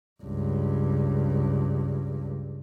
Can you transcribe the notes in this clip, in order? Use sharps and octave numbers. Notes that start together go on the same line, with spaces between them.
C#2 G2